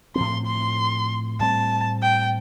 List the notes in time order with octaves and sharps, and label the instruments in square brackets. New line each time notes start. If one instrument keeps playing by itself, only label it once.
[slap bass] A2 F3 C4 [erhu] C6
[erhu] C6
[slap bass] A2 G3 C4 [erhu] A5
[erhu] G5